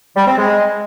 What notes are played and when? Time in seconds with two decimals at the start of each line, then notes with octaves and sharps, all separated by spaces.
0.16 G3
0.27 C4
0.37 G#3